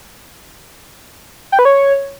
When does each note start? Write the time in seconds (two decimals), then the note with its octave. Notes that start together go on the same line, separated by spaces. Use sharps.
1.52 G5
1.59 B4
1.65 C#5